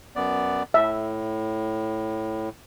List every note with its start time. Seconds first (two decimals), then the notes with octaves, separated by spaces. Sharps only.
0.16 F#2 B3 D5
0.74 A2 E5